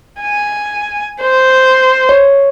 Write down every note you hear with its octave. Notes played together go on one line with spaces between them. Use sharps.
G#5
C5
C#5